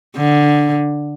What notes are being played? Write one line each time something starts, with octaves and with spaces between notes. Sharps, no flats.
D3